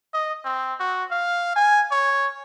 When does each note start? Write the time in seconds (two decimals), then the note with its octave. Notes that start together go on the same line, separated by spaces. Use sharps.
0.14 D#5
0.45 C4
0.80 F#4
1.11 F5
1.56 G#5
1.92 C#5